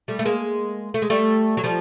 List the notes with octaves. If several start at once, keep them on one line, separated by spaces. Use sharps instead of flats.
G3 A3
A3
G#3 A#3
A3
G#3
G3 A3
F#3
F3 G3